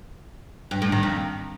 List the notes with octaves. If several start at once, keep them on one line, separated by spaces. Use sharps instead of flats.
G2
A2
D#3
F2